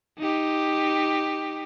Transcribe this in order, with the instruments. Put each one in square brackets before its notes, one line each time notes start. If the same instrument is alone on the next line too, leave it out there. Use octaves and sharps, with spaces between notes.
[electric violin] D#4 G4